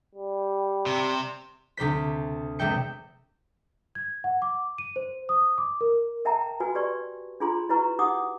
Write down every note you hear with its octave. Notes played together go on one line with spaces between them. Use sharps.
G3
C3
D2 C3 C5 B6
E1 C3 G#3 E5 G5 C#7
G#6
F#5
D6
D#7
C5
D#6
D6
A#4
A#4 E5 G5 A5 A#5
F#4 B4 G#5
G4 B4 D5 C6 C#6
D4 F4 G#4 A#5 C6
E4 F#4 B4 A#5 C#6
D#4 G4 F#5 D6 D#6